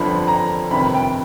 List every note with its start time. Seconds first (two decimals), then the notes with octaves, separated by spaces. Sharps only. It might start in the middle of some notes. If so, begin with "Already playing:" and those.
Already playing: G1 F2 D3 F3 B5
0.28 A#5
0.71 G1 F2 C3 D#3 B5
0.94 G5